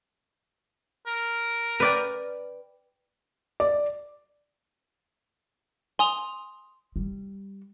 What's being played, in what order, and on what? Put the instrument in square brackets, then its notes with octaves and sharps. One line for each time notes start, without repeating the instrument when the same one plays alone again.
[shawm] A#4
[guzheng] B4 D5 G5
[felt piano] D5
[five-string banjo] G#5 [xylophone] C6 D#6 F7
[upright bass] G3